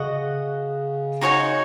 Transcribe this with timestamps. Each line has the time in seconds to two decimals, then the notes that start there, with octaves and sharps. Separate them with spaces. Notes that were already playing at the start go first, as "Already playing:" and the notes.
Already playing: C#3 F#4 D#5 F#5
1.21 D#4 F#4 C#5 G#5